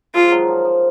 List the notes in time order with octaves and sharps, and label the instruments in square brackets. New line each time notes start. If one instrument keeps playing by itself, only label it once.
[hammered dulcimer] F3 G#3 [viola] F4
[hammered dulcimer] D#3 F#3
F3
F3